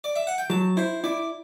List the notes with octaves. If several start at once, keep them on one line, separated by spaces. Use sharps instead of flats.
D5
E5
F#5
G5
F#3 A5
E4 C5
E4 D5